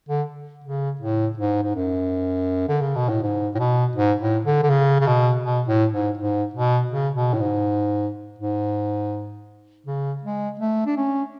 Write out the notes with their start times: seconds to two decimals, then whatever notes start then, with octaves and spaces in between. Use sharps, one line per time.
0.09 D3
0.64 C#3
1.01 A2
1.38 G#2
1.63 G#2
1.75 F#2
2.68 D3
2.81 C#3
2.95 B2
3.09 A2
3.22 G#2
3.55 A2
3.59 B2
3.96 G#2
4.21 A2
4.45 D3
4.63 D3
4.70 C#3
5.01 C#3
5.07 B2
5.44 B2
5.68 A2
5.92 G#2
6.18 G#2
6.54 B2
6.91 C#3
7.15 B2
7.34 A2
7.40 G#2
8.39 G#2
9.86 C#3
10.23 G#3
10.60 A3
10.86 D4
10.97 C#4